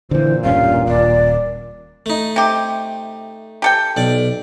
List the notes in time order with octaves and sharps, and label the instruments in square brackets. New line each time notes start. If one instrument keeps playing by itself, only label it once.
[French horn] A#2 [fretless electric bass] D3 E3 [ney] C5
[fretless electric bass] E1 G2 C#4 [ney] F5
[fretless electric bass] D#1 [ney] D5
[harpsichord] A3 D#4
[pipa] C3 G4
G4 A4 G5
[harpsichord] B1 D5